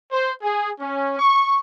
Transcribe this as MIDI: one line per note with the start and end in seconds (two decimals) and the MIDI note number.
0.12 0.32 72
0.42 0.71 68
0.79 1.17 61
1.19 1.60 85